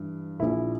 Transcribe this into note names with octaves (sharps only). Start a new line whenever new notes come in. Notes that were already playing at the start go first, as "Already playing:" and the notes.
Already playing: G2 E3
A#1 A#2 E4